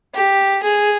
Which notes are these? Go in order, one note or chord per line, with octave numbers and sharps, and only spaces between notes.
G4
G#4